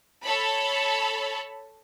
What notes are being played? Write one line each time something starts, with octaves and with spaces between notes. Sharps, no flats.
A4 C#5 A5 B5